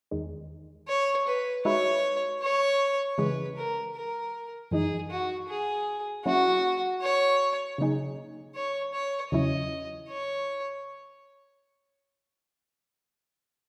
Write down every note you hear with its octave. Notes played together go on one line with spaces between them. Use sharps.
E2 D#3 G#3
C#5
B4
G#3 D#4 F#4 B4 C#5 E5
C#5
C#3 E3 G#3 B4
A#4
A#4
F#2 E3 G#3 D#4 G#4
F#4
G#4
F#3 A#3 C#4 E4 F#4
C#5
C#3 F#3 A#3 D#4 G#4
C#5
C#5
E2 C#3 F#3 C#4 E4 D#5
C#5